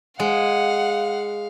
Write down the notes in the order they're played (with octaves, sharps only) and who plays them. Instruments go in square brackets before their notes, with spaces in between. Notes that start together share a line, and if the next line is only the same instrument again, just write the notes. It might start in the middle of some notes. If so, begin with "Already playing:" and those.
[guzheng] G#3 [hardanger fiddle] F5 [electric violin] F#5